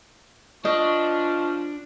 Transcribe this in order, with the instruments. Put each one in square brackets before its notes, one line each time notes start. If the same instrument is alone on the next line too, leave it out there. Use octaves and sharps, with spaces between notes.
[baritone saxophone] F3 [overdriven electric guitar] D4 [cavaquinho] D#5 [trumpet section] C#6